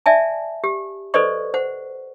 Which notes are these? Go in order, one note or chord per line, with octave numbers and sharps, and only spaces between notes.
D5 E5 G#5 A5
G4
A4 B4 C5 D5 D#5 C#6
C5 F#5